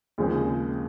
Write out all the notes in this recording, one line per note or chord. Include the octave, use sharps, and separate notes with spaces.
D#2 C#3 F3 G#3 C4